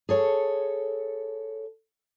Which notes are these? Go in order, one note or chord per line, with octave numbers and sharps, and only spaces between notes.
G#4 A4 C#5